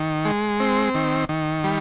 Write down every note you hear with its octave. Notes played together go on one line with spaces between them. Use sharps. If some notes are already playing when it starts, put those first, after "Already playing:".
Already playing: D#3
G#3
C4
D#3
D#3
G3